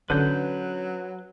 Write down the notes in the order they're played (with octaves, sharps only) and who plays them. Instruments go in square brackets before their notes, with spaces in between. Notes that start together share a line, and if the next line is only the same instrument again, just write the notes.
[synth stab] D3 [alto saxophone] F#3 [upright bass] C#4 [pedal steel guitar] B4 G6